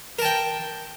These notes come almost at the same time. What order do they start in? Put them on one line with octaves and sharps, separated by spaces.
A#4 A5 G5